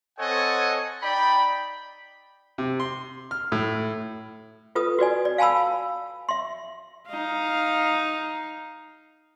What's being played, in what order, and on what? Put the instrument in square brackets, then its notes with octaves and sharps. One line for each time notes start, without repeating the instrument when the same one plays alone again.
[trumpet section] C4 A4 C#5 D#5 F#5 G#5
D#4 D5 G5 B5
[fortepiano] C3
C6
F6
A2
[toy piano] F4 A4 B4 D#6
F#4 B4 D5 G#5
D5
F5 G#5 A5 B5 E6
E5 C6
[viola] D#4 F5